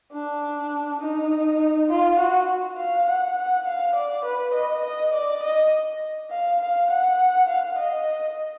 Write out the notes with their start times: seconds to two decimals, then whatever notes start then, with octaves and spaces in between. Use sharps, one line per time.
0.13 D4
1.01 D#4
1.90 F4
2.19 F#4
2.77 F5
3.07 F#5
3.37 F#5
3.66 F5
3.95 D5
4.25 B4
4.54 D#5
4.84 D#5
5.13 D5
5.43 D#5
6.31 F5
6.60 F5
6.90 F#5
7.49 F5
7.79 D#5